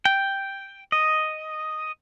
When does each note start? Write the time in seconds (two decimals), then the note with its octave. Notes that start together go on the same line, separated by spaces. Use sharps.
0.05 G5
0.92 D#5